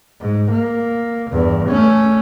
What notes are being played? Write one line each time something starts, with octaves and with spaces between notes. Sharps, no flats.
G#2
A#3
E2 G2
A3 C#4